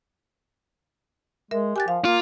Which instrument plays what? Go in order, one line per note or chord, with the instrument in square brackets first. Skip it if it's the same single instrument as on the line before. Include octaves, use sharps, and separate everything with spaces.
[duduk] G#3 [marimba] A#4 E5
[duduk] G4 [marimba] G#5 F#6 A6
[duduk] F3 [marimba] F5
[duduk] A#3 [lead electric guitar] F4